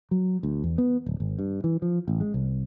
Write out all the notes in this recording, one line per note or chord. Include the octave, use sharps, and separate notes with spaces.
F#3
D2
E2
B3
D1
G#1
G2
E3
F3
A1
G#3
C2